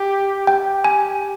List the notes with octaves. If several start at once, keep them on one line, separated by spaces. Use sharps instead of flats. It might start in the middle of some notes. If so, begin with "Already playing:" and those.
Already playing: G4
G4 G5
G#5